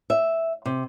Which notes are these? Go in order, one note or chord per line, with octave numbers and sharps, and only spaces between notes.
E5
C3